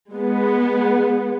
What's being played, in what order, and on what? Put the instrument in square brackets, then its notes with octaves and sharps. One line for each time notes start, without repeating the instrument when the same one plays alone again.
[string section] G#3 B3